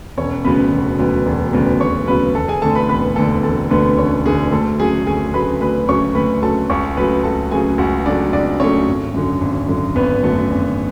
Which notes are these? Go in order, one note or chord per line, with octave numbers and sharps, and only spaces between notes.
E1 C#4 C#5
D2 C#3 F#3 B3 B4 B5
E1
D2 C#3 F#3 B3
E1
D2 C#3 F#3 B3
E1 C#5 C#6
D2 C#3 F#3 B3 B4 B5
E1 A4 A5
G#4 G#5
D2 D3 A3 A4 A5
B4 B5
E1 B4 B5
D2 D3 A3 A4 A5
E1 A4 A5
D2 D3 A3 B3 B4
E1 C#4 C#5
D2 D3 A3 G#4
D2 A3 A4
C#3 F#3 A3 G#4 G#5
D2 G#4 G#5
C#3 F#3 A3 B4 B5
D2 B4 B5
C#3 F#3 A3 C#5 C#6
D2 B4 B5
C#3 F#3 A3 A4 A5
C#2 C#5 C#6
C#3 F#3 A3 B4 B5
C#2 A4 A5
C#3 F#3 A3 G#4 G#5
C#2 F#4 F#5
C#3 F#3 A3 D4 D5
C#2 D4 D5
C#3 F#3 A3 C#4 C#5
G#1
F#2 D3 F#3
G#1
F#2 D3 F#3
G#1 B3 B4
F#2 D3 F#3 A3 A4
G#1